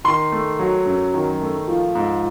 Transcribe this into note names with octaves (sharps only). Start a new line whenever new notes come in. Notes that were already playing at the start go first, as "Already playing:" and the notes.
D#3 C6
A3
F#3
F#2
D#3
A3
F3
G#2